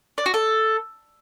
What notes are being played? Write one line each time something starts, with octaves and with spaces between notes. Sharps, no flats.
D5
F#4
A4